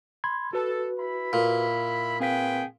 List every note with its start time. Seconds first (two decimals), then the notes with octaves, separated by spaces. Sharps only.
0.24 B5 C6 G#6
0.53 F#4 A4 B4
1.00 E4 B5
1.33 A#2
2.20 C4 G#4 B4 F5 G5 B6